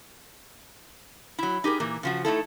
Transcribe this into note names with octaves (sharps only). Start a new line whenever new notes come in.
F#3 E4
D#4 G4 G#4 A#4
A#2 E3 A#3
C#3 F3 F#4
A3 D#4 E4 A4